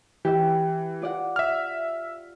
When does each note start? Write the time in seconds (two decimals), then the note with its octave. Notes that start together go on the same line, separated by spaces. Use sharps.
0.25 E3 G4 E5
1.02 F4 D5 F#5
1.36 E5 F6